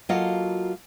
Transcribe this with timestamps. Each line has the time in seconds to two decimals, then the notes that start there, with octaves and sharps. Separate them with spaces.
0.09 F#3 A#3 F4 F#4 A4 D#5